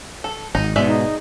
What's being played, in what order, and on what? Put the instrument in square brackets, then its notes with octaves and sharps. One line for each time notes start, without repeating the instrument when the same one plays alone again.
[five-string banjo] A4
[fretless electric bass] G#1 [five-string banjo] D#4
[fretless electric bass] G#2 B2 [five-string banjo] G#3 D5 E5
[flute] D#4